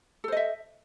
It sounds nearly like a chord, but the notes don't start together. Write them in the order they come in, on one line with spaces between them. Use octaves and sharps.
A4 C5 D#5 E5